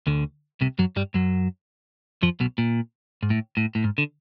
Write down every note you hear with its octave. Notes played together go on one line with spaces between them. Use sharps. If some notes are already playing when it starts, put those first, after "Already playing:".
D2 D3
C2 C3
F#2 F#3
G2 G3
F#2 F#3
F2 F3
B1 B2
A#2
G#2
A2
A2
A2
G#2
D3